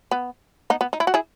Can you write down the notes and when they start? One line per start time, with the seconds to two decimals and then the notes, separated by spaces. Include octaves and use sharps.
0.11 B3
0.70 B3 D#4
0.81 B3
0.93 D#4
1.00 E4
1.07 F#4
1.14 E4 G#4